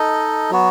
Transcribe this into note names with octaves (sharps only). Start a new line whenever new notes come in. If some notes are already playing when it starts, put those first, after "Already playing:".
Already playing: D#4 A4 D#5
F#3 B3 F#4